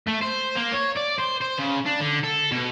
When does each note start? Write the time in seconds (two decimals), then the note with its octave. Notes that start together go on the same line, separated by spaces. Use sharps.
0.07 A3
0.21 C5
0.55 A#3
0.72 C#5
0.96 D5
1.18 C5
1.41 C5
1.58 C#3
1.86 D4
2.00 D3
2.23 A4
2.51 B2